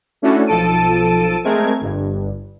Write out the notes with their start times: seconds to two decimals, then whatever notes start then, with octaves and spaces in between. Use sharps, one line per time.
0.22 A3 C#4 D4 E4 F#4 A4
0.47 B1 F3 A4 A5 D7 D#7
1.44 G#3 A3 C4 A#4 G#6
1.81 G1 G2